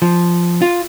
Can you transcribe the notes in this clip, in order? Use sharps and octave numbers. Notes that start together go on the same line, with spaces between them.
F3
F4